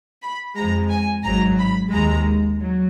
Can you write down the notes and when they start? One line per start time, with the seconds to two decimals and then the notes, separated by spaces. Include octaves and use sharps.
0.23 B5
0.57 F2 F3 G#3 A#5
0.91 G#5
1.25 G#1 G#2 F#3 A#5
1.59 B5
1.92 D#2 D#3 G#3 A#5
2.60 F#3